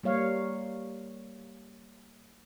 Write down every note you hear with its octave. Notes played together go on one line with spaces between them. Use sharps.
G3 A#3 C#5 F5